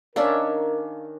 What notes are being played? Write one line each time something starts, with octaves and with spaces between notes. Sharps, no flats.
D#3 C#4 D4 A#4 D5 E5 F5